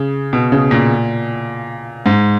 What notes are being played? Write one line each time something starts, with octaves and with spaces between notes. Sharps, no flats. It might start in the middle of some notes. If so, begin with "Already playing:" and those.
Already playing: C#3
B2
C#3
A#2
G#2